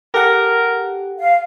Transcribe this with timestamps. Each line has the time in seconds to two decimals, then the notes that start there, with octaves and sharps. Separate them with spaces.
0.14 G4 A4 A#4 F#5
1.19 F5